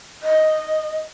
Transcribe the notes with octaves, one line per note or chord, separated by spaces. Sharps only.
D#5